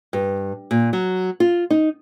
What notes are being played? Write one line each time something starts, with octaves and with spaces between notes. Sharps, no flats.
G2
A#2
F#3
F4
D#4